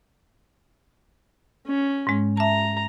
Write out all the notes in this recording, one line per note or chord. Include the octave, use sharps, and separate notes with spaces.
C#4
G#2 G#3
E5 A5 A#5